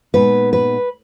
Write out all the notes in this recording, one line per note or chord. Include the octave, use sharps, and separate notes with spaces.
A#2 G#3 B3 D#4 B4
B4